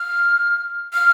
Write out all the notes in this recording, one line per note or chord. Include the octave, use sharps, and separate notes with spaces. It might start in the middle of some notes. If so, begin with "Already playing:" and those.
Already playing: F6
F6